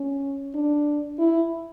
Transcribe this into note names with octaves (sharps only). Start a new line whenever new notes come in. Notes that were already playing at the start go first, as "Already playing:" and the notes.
Already playing: C#4
D4
E4